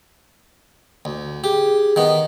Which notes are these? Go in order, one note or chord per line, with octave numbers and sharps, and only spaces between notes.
D2
G4 G#4
D#3 B3